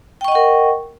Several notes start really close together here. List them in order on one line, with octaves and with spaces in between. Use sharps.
G5 C#6 D#5 F#5 A#4